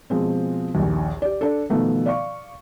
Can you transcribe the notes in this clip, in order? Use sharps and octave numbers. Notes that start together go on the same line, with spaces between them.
B2 F3 G#3 C4
A#1 D#2
G4 D5
D4 A4
B2 D#3 F3 A3 B3
D5 F5 C#6